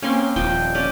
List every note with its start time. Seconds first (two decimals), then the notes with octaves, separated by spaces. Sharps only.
0.02 A#3 C4 C#4 C6
0.36 D#1 F3 G5
0.75 C#4 G4 D5